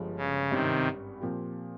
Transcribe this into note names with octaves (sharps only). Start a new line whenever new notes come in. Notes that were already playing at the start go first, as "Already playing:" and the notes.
Already playing: G1 G2 F3 G#3
C#3
G#1 G2 C3 D#3 G3 C#4 G4
A#2 F3 C4 G4